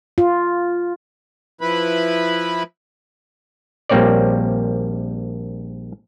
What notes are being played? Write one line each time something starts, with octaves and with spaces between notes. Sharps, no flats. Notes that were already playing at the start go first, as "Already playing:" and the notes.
F4
F3 E4 B4 B5
A#1 G3 A#3 C4 C#5 D5